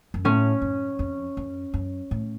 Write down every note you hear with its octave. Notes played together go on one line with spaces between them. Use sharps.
F#2
A2 C#4
F#2
F2
F#2
F#2
A2